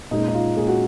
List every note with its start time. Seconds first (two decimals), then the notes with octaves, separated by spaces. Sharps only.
0.11 A#2 G#3 C#4 D#4
0.28 D#4
0.34 F4
0.57 A#2 G#3 C#4 G#4
0.68 F#4